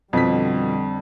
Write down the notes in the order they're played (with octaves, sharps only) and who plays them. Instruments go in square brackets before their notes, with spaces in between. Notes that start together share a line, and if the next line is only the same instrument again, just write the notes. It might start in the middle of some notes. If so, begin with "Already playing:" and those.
[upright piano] F2 B6 [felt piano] B2 F3 [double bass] D3 G3